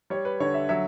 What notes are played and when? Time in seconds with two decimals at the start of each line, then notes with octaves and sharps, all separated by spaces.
0.10 G3 C#5
0.25 B4
0.40 D3 C#5
0.54 E5
0.69 F#3 E5